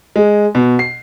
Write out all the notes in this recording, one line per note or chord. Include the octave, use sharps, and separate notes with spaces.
G#3
B2
C7